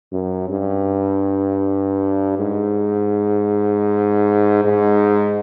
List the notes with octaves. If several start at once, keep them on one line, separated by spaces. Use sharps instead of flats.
F#2
G2
G#2
G#2